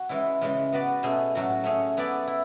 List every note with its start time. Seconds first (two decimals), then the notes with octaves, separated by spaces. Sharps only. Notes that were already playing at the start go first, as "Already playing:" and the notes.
Already playing: F#4
0.09 E3 G#3 C#4 E4
0.41 C#3 E3 G#3 C#4
0.72 B3 F#4 B4 D5
1.03 B2 A3 C#4 G#4
1.35 A2 F#3 C#4 F#4
1.64 A3 C#4 G#4 C#5
1.97 B3 E4 B4 D5
2.28 E4